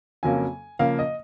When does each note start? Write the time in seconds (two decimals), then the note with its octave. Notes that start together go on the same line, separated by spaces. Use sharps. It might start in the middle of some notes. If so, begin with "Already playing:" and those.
0.23 F2 C#3 F#3 A#3 G#5
0.79 C#3 F3 A#3 F5
0.99 D#5